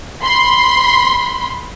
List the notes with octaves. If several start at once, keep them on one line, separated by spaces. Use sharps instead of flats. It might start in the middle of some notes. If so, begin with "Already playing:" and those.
B5 C6